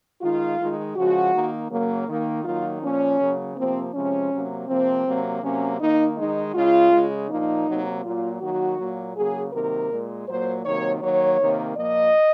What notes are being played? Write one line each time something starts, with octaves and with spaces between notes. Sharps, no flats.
D#3 G#3 F4
D#3 G#3
C#3 F3 G#3 F#4
D#3 A#3
C#3 F#3 A#3
D#3 A#3
D#3 F#3 A#3 F4
A#2 F3 A#3 C#4
C#3 F#3 A#3
C3 F3 A#3 C4
C3 F3 G#3 C#4
C3 F#3 A#3
C3 F3 A#3 C4
C3 F#3 A#3
C3 F#3 A#3 C#4
D#3 A#3 D#4
D#3 G#3 D#4
C#3 G#3 F4
C#3 G#3
A#2 F3 A#3 D#4
C3 F#3 A#3
A#2 F#3 A#3 F4
D#3 F#3 A#3 F#4
A#2 F#3 A#3
C#3 F#3 A#3 G#4
C3 D#3 F#3 A#3 A#4
A#2 G#3
A#2 F#3 A#3 C5
C3 D#3 F#3 A#3 C#5
D#3 F#3 A#3 C#5
C3 D#3 A#3
A#2 F3 A#3 D#5